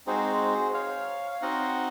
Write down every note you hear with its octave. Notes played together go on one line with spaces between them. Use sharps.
G#3 C4 D#4 F#4 G#4 C5
C#5 F5
F5
C4 D#4 F#4 D#5 F#5